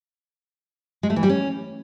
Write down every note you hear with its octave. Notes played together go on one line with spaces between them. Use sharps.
G#3
A3
E3
G3
C#4